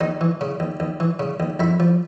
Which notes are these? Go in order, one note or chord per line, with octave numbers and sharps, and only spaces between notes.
D#2 D#4
E3
C#3
D#2
D#2
E3
C#3
D#2
F2 E4
F3